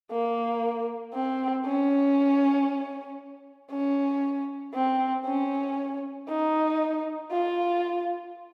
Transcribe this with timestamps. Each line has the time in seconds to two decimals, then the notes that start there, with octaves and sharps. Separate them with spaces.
0.12 A#3
1.14 C4
1.65 C#4
3.71 C#4
4.74 C4
5.25 C#4
6.29 D#4
7.32 F4